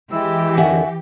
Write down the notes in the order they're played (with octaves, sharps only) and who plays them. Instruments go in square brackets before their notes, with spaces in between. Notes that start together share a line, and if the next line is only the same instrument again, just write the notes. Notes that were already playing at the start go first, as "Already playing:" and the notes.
[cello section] E3 G4 [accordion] G#3 E4 E6
[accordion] F2 D3 D#3 [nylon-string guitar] E5 F#5 G#5